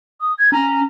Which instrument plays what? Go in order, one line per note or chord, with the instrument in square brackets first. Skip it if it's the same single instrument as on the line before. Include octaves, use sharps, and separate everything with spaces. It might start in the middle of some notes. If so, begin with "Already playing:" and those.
[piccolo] D#6
G#6
[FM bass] C#4 [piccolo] A#5